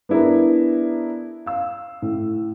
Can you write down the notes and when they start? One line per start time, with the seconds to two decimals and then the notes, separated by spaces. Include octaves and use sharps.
0.09 B3 D4 E4 G#4 A#4
1.46 F5 E6
2.02 A2